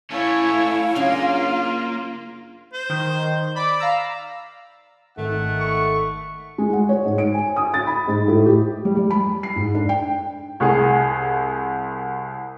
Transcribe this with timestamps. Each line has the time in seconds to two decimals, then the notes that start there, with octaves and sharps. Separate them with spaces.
0.11 A3 C#4 E4 C#5 F5
0.95 F#2 C#3 A#3 D4 F4
2.73 C5
2.89 D#3
3.56 D5 B5 D6
3.80 F5 A#5 E6
5.18 G#1 D#3 A3 F#5
5.60 C#6
6.58 G#3
6.73 F#5
6.89 C#5
7.05 G#2
7.18 D7
7.34 G#5
7.56 D#6
7.74 A6
7.87 B5
8.07 G#2
8.28 A2
8.46 G4
8.85 G3
8.97 G3
9.10 B5
9.43 C7
9.56 G#2
9.75 D4
9.89 G5
10.60 C2 G#4